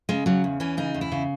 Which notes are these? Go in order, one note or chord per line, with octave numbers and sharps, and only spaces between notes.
C#3 G#3
C#3 F#3
E2
E3 C#4
C#3 D#4
E2
E4
C#3